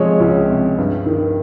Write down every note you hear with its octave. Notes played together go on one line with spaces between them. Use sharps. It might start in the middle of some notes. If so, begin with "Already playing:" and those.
Already playing: C3 F3 G#3 C#5
C#2
C3
G2
D#3